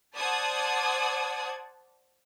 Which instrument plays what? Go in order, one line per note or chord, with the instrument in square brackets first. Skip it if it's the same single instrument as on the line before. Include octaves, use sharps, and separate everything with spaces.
[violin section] C5 D5 F#5 A5 D#6 G#6